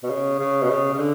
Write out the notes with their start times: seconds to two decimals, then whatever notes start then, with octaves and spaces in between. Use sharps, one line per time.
0.03 B2
0.10 C#3
0.39 C#3
0.62 B2
0.70 C#3
0.94 C#3
0.99 D3